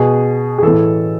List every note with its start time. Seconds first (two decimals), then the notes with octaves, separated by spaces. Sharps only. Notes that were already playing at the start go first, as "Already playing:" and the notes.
Already playing: B2 G#4
0.58 G#4
0.63 A2 E3 A4